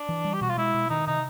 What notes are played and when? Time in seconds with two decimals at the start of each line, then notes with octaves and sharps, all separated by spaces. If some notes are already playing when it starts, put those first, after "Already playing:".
Already playing: D4
0.09 E3
0.25 G3
0.34 G4
0.41 B2 F#4
0.50 F4
0.57 G#3 E4
0.74 B2
0.90 D#3 D#4
1.07 C3 D#4